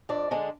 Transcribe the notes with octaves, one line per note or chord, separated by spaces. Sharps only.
F2 D4 D5
D3 G#3 D4